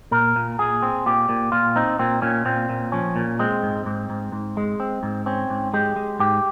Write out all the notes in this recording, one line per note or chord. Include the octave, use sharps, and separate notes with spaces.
A#2 A#4
A#2
A#2 G#4
C4
A#2 G4
A#2
A#2 F4
C4 D#4
A#2 C4
A#2 C#4
A#2 C4
A#2
F3 C#4
A#2
G#3 C4
G#2
G#2
G#2
G#2
G#3
C4
G#2
C4 C#4
G#2
G#3 G4
G#3
G#2 G4